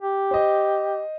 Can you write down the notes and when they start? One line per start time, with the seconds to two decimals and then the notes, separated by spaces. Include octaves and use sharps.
0.01 G4
0.31 C5 D#5